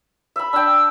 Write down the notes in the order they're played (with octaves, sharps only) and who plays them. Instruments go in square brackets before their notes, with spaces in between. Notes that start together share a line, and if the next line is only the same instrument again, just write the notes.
[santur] E5 B5
[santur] D4 G5 [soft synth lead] E6